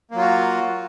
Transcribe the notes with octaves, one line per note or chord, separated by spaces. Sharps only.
F#3 A#3 F4 F#4